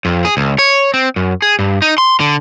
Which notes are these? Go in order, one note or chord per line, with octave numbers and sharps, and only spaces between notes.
F2
G#4
C#2
C#5
C4
F#2
G#4
G2
D#4
C6
D3